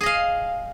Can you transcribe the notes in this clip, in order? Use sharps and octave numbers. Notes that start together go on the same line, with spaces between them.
G#4 D#5 F5